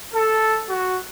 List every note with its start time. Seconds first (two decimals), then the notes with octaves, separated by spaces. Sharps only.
0.14 A4
0.70 F#4